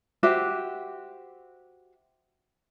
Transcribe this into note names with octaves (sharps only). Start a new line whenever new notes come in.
F#4 G4 C5 E5